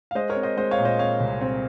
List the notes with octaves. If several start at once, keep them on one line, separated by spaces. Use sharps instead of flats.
F5
G#3 C5 D#5
A#4 C#5
C4
C5 D#5
G#3 C5 D#5
C#5 F5
A#2
C5 D#5
C4 C#5 F5
C2
C4